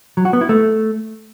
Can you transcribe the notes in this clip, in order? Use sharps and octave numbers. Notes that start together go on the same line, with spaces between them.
F#3
F#4
B3
E4
A3